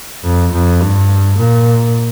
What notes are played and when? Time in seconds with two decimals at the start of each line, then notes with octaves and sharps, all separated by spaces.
0.24 F2
0.52 F2
0.81 G2
1.37 A#2